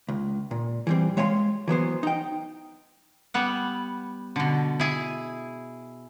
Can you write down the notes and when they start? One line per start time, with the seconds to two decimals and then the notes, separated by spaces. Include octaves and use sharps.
0.08 C#2
0.51 A#2
0.87 E3 G3 C4
1.17 G#3 C#5 F5 G5 C6
1.68 E3 F#3 B3 C5
2.03 D#4 G5
3.34 G3 B3 F#5
4.36 B2 D3
4.80 E4 G#4